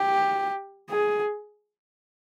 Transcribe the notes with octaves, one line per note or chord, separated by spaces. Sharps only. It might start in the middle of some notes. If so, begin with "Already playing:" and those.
Already playing: G4
G#4